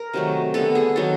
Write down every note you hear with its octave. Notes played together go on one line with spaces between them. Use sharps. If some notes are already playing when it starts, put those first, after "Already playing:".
Already playing: A#4
C3 D#3 F#3 A3
D3 G3 B3 A4
G#4
D#3 F#3 B3 A4